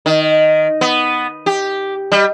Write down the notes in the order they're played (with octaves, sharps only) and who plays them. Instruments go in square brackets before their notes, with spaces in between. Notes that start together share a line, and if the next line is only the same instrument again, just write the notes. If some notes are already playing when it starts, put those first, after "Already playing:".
[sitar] D#3
B3
G4
G3